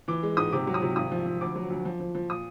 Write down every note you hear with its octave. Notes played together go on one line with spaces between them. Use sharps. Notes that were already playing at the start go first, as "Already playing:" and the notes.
E3 D6
G#3
G#2 D#6
C3 D6
F#3
D#6
C3
G#1 D#6
F3
F3
D2 D6
F#3
D2
F3
F3
F3
A#2 D#6